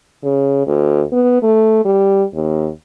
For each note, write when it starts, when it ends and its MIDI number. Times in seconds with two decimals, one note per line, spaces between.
0.24 0.65 49
0.67 1.03 38
1.13 1.39 59
1.42 1.81 57
1.85 2.23 55
2.34 2.69 39